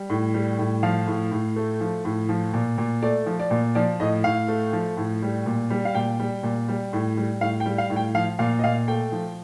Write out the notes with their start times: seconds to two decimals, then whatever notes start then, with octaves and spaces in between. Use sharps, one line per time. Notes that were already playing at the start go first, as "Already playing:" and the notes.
Already playing: G3
0.10 A2
0.34 G3
0.59 A2
0.83 F3 F5
1.07 A2
1.32 A2
1.56 A3
1.81 F3
2.05 A2
2.29 F3
2.54 A#2
2.78 A#2
3.02 A3 D5
3.26 F3
3.40 D5
3.51 A#2
3.75 F3 D5
4.00 A2 D#5
4.24 A2 F5
4.48 A3
4.73 F3
4.97 A2
5.22 G3
5.46 A#2
5.70 G3
5.85 F5
5.95 A#2 G5
6.20 G3
6.43 A#2
6.68 G3
6.93 A2
7.17 G3
7.41 A2 F5
7.60 G5
7.66 G3
7.78 F5
7.90 A2
7.96 G5
8.15 F3 F5
8.39 A#2 F5
8.59 D#5
8.64 A#2 F5
8.88 A3 G5
9.12 F3